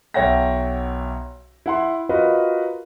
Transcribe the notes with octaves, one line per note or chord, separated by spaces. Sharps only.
B1 C#5 E5 F#5 G5 A#6
E4 F#5 C6
F4 F#4 A#4 B4 D#5